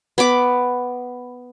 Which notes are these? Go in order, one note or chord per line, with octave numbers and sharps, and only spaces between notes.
B3 B5 D6